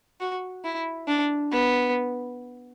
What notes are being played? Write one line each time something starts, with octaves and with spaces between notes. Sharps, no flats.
F#4
E4
D4
B3